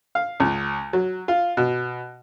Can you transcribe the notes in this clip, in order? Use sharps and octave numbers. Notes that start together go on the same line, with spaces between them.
F5
C#2
F#3
F4
B2